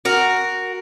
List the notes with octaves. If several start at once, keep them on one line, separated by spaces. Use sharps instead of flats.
F#4 A#4